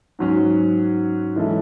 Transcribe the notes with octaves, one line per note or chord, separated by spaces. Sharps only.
G#2 F#3 C#4
E3 G#3 C#4 E4 A4